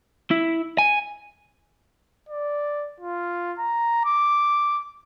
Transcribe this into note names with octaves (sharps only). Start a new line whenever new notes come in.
E4
G#5
D5
F4
A#5
D6